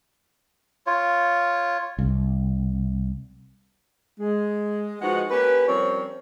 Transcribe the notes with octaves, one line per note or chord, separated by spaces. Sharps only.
F4 C#5
C2
G#3
F3 G#3 D#4 F#4 B4 F#5
A#3 C#4 G4 B4
F3 G3 C4 C#4 A#4 C#5